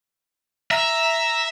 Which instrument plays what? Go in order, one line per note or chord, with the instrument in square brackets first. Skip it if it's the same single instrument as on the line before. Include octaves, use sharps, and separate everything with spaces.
[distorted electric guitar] E5 [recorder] A#5